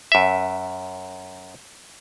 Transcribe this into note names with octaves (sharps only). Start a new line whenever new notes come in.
F#2 E5